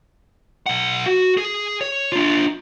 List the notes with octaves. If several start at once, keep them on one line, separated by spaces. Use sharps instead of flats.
B1 F#5
F#4
G#4
C#5
D4 F4